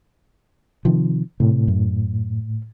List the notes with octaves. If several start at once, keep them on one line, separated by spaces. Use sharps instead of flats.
C3 D#3 F3
A2 C3
F#2